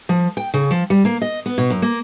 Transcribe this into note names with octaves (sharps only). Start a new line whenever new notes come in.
F3
G5
C#3
F3
G3
A#3
D#5
B3
B2
F#2
A#3